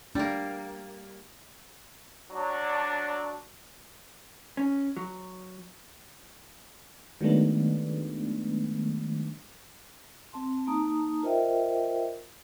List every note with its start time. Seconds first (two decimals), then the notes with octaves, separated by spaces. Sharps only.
0.15 G3 A#3 D4
2.32 F#3 D4
4.57 C#4
4.97 F#3
7.21 D#3 F#3 G#3 A3 B3 D4
10.33 C4 A5 C6
10.67 A#3 D#4 A5 A#5 D#6
11.22 F4 A#4 C5 D#5 E5 G5